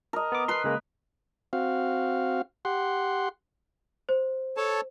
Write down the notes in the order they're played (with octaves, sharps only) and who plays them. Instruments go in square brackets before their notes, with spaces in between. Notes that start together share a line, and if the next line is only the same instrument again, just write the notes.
[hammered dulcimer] A#4 D#5
[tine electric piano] B3 D6
[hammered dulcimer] A#4 B4 [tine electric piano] C6 C7
[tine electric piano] C#3 G#3 A#3
[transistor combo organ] C4 F#4 F5
G4 F#5 C6
[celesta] C5
[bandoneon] A4 C#5 A5